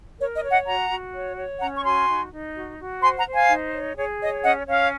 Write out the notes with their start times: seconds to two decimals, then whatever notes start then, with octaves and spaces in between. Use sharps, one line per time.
0.19 A#4 C#5
0.35 D#5
0.43 C#5
0.50 D#5 F#5
0.66 F#4 F#5 A#5
0.89 F#4
1.13 C#5
1.37 C#5
1.60 C#4 F#5 A#5
1.74 C#6
1.84 F#4 G#5 C6
2.08 D#4
2.32 D#4
2.55 F#4
2.79 F#4
3.02 C5 G#5 C6
3.18 F#5 A#5
3.26 C5
3.34 F5 G#5
3.50 D#4
3.73 C#5
3.97 G#4 C#5
4.21 C#5 D#5
4.44 C#4 D#5 F#5
4.67 C#4 C#5 F5